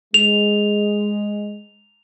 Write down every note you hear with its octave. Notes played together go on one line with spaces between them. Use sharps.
G#3 F7